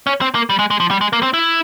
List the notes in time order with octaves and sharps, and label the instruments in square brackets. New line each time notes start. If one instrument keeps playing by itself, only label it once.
[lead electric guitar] C#4
C4
A#3
G3
G#3
G#3
F3
G3
G#3
A#3
C4
E4